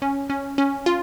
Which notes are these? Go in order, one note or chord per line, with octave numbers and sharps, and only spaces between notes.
C#4
C#4
C#4
F4